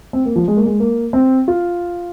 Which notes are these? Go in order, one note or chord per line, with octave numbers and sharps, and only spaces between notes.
C4
A#3
F3
G#3
A#3
G#3
A#3
C4
F4